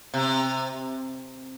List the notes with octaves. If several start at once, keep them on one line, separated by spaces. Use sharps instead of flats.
C3